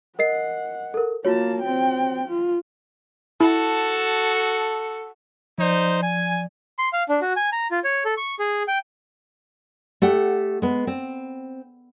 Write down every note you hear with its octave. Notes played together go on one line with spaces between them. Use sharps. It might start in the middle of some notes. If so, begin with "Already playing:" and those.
A#4 D#5 F#5 C7
A4 A#4
A#3 F4 F#4 C#5 A5
C4 G5
F4
E4 F#4 A4 A5
F3 D#4 C5 D5
G#5
C6
F5
D4
F#4
G#5
A#5
F4
C#5
A4
C#6
G#4
G5
A3 G4 F#5
G#3 B3
C4